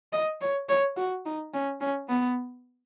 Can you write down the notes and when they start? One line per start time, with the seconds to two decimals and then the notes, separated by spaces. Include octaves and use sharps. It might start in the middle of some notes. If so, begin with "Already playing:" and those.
0.13 D#5
0.41 C#5
0.69 C#5
0.97 F#4
1.25 D#4
1.54 C#4
1.81 C#4
2.09 B3